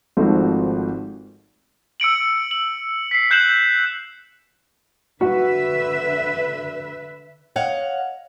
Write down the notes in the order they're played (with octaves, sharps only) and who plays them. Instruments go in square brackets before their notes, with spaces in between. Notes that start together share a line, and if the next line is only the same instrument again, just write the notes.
[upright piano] G#1 G#2 F3 A3 C4 F#4
[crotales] E6 C#7 D7 F#7
F#7
B6 C7
F#6 G6 C7 E7 F#7
[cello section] D3 B4 E5 [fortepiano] F#4
[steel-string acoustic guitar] C#5 D#5 F5 F#5